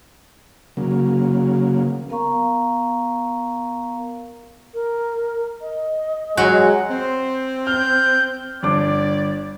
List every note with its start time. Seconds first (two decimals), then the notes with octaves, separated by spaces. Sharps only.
0.77 C#3 F#3 A#3
2.10 B3 A#4 F5 A#5 C#6
4.74 A#4
5.61 D#5
6.37 F#3 G#3 F#4
6.90 C4 C5
7.67 F6 G6
8.63 G1 D4 D5 D6